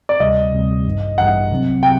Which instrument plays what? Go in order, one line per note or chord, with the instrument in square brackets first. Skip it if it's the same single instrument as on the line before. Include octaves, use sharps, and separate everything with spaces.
[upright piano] D5
[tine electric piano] D2 C3 G3 [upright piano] D#5
[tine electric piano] D2 C3 G3
A1 G2 D#3
[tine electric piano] A1 G2 D#3 [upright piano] F#5
[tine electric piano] C2 C3 F#3 C4
[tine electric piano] C3 F#3 C4 [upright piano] G5